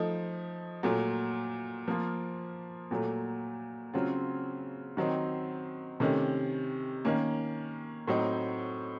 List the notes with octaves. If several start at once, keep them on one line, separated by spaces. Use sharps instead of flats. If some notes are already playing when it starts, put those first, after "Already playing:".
Already playing: F3 A3 D#4
A#2 F#3 A3
F3 A#3 F4
A#2 F#3 A3
C#3 F#3 C4 F4
D#3 F#3 C4 D#4
C3 D#3 A3 C#4
D#3 A#3 C#4
A2 F#3 C4 D#4